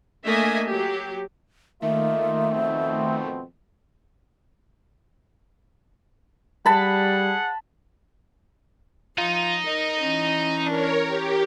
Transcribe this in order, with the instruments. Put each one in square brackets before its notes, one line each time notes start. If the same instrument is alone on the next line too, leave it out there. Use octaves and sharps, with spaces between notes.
[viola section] A3 A#3 D4 D#5 E5 G#5
F#3 G4
[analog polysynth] D#3 A3 [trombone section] A#3 D#4 F4 [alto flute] E5
[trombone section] F2 B2 C4
[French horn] G3 [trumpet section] G#4 F#5 [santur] A5 B5
[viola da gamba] F3 [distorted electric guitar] D#4 [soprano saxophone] F4
[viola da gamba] A#4 [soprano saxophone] D#5
[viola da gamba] E3 C#4
[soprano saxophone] D4 [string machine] A#4 C#5
[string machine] G4 [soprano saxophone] A#4